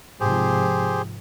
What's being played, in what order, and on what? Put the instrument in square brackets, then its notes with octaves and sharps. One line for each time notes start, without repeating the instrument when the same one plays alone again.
[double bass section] G#2 C3 F3 [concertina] G4 G#4 C5